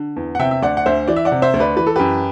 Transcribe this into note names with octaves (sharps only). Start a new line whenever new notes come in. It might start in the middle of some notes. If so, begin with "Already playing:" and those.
Already playing: D3
E2
F#5
C3 E5 G5
E5
D2 D5 F#5
F#5
D2 C5 E5
E3 D5
E5
D5 F#5
C3
C5 E5
D2
B4 D5
E3 B4
A4
F#2 G4 B4